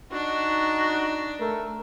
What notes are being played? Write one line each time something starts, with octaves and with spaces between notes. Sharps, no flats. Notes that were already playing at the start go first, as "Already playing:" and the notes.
D4 D#4 F#4
A3 A#4